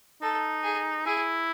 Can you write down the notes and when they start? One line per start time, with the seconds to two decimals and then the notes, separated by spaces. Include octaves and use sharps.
0.21 D#4 A4
0.64 G#4
1.06 E4 G#4